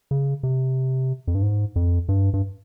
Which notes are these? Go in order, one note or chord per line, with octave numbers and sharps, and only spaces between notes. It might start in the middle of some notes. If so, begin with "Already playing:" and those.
C#3
C3
F2
G2
G#2
F2
G2
G2